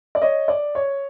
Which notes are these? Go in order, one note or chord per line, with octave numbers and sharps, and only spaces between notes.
D5
C#5 D#5
D5
C#5